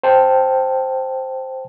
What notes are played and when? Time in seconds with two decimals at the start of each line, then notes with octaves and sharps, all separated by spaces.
0.03 C5 G5 A5